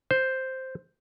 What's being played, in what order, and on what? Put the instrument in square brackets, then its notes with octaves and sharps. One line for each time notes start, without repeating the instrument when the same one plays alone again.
[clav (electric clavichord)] C5